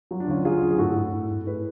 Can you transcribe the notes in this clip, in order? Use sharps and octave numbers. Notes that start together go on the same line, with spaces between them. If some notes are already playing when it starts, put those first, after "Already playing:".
F#3 F4
D4
D2 C#4 F4
F#3 F4 G#4
D2
G#4
A2 F#4 A4
A2
A2
A2
A2 G#4 B4